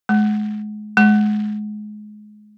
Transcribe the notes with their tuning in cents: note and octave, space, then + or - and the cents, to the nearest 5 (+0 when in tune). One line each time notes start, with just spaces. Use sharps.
G#3 +30
G#3 +25